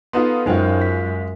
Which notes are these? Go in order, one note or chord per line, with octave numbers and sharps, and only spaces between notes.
B3 D#4 F4 A4 B4 C6
F#2 G#3 D#4 F4 C5 G5
B6